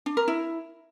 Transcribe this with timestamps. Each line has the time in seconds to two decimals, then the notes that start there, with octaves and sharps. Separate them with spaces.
0.06 D4
0.17 A#4
0.28 E4